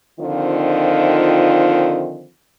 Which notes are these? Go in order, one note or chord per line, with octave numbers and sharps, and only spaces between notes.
D3 D#3 F3 C4 D#4 F4